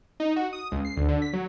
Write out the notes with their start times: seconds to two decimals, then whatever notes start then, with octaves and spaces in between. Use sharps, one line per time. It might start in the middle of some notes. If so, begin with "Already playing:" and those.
0.20 D#4
0.36 F#4
0.53 D#6
0.72 C#2
0.85 C7
0.96 D2
1.08 D3
1.22 B6
1.33 F#3